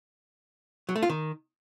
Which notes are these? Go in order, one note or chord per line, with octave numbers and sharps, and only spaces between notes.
F#3
A3
F4
D#3